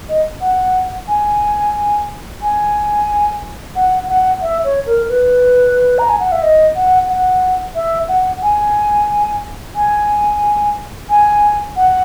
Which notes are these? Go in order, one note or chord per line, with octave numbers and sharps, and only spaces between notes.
D#5
F#5
G#5
G#5
F#5
F#5
E5
C#5
A#4
B4
A#5
G#5
F#5
E5
D#5
F#5
F#5
E5
F#5
G#5
G#5
G#5
F#5